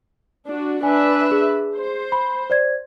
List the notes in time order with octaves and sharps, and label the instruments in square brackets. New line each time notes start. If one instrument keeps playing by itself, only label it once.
[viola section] D4 F#4
[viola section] D4 B4 E5 [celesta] G#5
[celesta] G#4
[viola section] C5
[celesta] B5
C5 D5 G#6